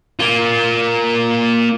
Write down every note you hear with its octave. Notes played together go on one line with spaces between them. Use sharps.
A#3 F4